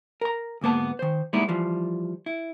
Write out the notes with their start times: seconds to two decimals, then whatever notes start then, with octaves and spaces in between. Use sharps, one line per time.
0.21 A#4 A#5
0.61 D2 G#2 A#3 B3 A5
0.99 D#3 C5
1.33 G3 G#3 A#3 B3 D#4 E4
1.48 E3 F3 G3
2.26 E4